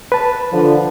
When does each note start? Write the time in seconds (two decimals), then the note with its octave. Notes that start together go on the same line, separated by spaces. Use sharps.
0.12 B4 A5
0.52 D3 F3